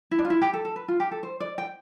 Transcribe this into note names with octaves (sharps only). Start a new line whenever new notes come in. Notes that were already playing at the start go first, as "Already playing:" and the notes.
E4
D4
F4
E4
G4
A4
A4
B4
F4
G4
A4
C5
D5
G5